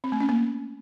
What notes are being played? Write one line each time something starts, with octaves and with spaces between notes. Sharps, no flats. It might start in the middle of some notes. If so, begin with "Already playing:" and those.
C4
A3
C#4
A#3